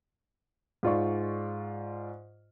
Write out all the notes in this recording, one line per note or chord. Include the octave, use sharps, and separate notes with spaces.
G#2 F4 D5 C#6